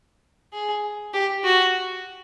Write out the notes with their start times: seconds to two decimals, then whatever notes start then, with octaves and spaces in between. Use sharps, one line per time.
0.53 G#4
1.13 G4
1.44 F#4